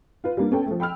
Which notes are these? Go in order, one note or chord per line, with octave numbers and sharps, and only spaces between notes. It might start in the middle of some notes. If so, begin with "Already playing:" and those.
F4 B4
G3 A#3 D4
B3 C#4 A4 G5
F3 A3
G5 B5 E6 F6